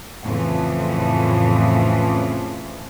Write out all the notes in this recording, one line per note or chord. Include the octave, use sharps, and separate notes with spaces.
F2 A2 C#3 E3 F3